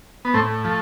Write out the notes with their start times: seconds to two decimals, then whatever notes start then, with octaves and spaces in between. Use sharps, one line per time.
0.25 B3
0.34 A2 A3 C4
0.65 F3 A3